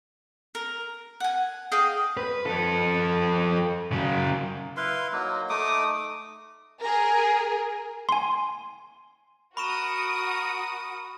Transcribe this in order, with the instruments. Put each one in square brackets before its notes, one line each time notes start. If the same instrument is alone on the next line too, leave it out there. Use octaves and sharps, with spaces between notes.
[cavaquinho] A#4
F#5 G#5
G#4 D#5 F5 G5
[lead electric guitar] B4
F3 A4
C#3 F#3
[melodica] E4 B4 F5 C6
F#3 A#3 D#4
A3 D#4 D6 D#6
[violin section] G#4 A#4
[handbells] G#5 C6
[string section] F#4 D#6 [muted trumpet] A#4 [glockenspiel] B5 C#6 E7